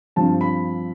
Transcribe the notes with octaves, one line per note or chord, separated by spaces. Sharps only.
G2 F3 C4 A5
B5